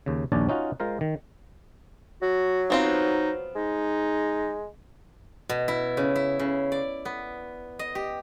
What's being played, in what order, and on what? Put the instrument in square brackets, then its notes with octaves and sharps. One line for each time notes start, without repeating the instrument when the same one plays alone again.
[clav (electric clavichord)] D#2 C#3
A#1 D#2 C#4 D4 C#5 A5
C#4 D#4 F4 F#4
G#3 F4 A#4 C5
D#3
[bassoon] F#3 [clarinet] F#4
[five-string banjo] B3 C4 F4 [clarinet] D#4
[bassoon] G#3 [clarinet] D#4
[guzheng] B2
E4
C#3
E4
C#3
D5
B3
D#5
G4